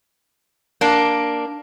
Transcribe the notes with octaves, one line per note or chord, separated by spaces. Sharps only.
A#3 D4